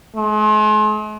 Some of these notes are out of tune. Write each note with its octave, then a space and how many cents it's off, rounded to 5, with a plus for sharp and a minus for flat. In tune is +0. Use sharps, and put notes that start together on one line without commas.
G#3 +45